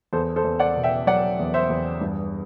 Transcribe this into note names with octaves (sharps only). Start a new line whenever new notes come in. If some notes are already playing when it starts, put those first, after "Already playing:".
E2 A4 C5
A4 C5
E2
D5 F#5
B2
E5 G5
F#3 D5 F#5
E2
C5 E5
E2
G2